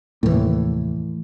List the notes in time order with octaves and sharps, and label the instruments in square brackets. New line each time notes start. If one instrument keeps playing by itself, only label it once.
[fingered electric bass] F1 D#2 A#3 [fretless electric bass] A2 E3